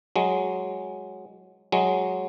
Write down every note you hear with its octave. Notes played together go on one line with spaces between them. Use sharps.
F#3 G#3
F#3 G#3